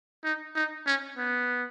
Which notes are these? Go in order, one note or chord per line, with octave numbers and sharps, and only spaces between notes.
D#4
D#4
C#4
B3